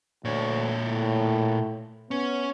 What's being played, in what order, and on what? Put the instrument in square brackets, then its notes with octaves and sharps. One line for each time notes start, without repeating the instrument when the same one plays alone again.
[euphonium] D2 [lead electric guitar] A#2 C#5
[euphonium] A2
[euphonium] B3 [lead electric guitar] C#4